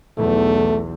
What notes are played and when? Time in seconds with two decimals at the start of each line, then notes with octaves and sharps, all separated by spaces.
0.18 B1 E2 A3